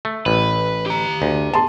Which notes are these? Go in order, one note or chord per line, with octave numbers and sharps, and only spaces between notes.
A3
A1 B4
G4 A#5
D2
A5 C6